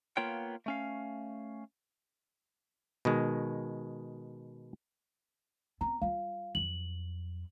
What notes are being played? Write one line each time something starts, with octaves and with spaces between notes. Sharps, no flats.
A#3 B3 F4 C#5 G5
A3 C#4 F5
B2 D#3 G#3
B3 C4 A#5
G3 F4 F5
F2 F#3 F#7